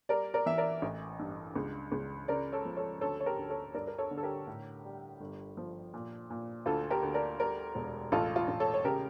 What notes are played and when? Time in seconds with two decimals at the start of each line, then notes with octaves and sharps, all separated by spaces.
0.09 G3 A#4 D5
0.34 A#4 D5
0.46 E3 E5
0.58 A#4 D5
0.82 A1
1.19 G2
1.56 C#2
1.92 C#2
2.28 C#3 A#4 D5
2.52 A4 C#5
2.65 F3
2.77 A4 C#5
3.01 D2 A4 C#5
3.20 C#5
3.26 G4 A#4
3.37 D2
3.50 A4 C#5
3.74 G2 A#4 D5
3.87 A#4
3.98 A4 C#5
4.11 D3
4.18 A4
4.23 G4 A#4
4.47 A2
4.84 G3
5.20 G1
5.57 F3
5.94 A#2
6.30 A#2
6.66 D2 F4 A4
6.90 G4 A#4
7.03 D2
7.14 A#4 D5
7.39 G3 A#4 D5
7.75 E1
8.12 A1 F4 A4
8.36 F4
8.48 A1
8.60 A4 C#5
8.74 C#5
8.85 C#3 G4 A#4